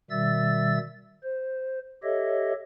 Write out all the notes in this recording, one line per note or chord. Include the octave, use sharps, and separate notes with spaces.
B2 D#3 G3 E5 E6 A6
C5
G4 A4 C#5 D#5 E5